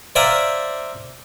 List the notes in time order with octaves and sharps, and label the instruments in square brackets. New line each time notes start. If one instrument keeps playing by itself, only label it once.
[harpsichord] C5 D5 E5 F5 G#5 A#5